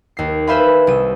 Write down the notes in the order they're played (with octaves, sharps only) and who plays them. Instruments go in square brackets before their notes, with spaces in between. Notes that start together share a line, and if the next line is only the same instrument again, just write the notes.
[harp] D#2 C7
B4 C5 E5 F5 G#5 B5
C2 D#7